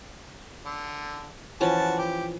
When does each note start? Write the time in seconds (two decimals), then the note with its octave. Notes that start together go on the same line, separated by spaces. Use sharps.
0.65 D3
1.61 E3 F3 C#4 F#4 A5
1.98 G4